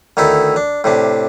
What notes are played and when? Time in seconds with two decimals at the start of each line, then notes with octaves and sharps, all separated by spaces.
0.17 D2 D#3 D#4 E4 A4
0.56 D4
0.84 A2 C3 D4